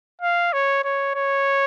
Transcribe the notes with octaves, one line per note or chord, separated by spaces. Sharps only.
F5
C#5
C#5
C#5